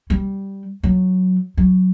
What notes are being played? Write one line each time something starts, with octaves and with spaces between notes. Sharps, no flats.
G3
F#3
F#3